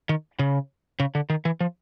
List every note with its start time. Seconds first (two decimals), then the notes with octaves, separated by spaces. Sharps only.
0.09 D#3
0.39 C#3
1.00 C#3
1.15 D3
1.30 D#3
1.45 E3
1.61 F3